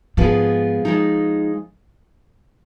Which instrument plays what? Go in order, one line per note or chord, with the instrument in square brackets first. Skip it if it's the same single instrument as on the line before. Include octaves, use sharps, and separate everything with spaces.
[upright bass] G#2 [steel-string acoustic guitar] F3 B3 F4 G#4
[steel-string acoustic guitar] F3 G#3 D#4